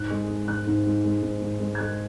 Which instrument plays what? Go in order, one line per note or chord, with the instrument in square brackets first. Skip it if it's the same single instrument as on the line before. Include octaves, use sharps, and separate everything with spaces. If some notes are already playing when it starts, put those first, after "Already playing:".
Already playing: [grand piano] G#2 F#6
G#3
G#3
G#2 F#6
G#2
G#3
G#3
G#2
G#2
G#3
G#6
G#3 F#6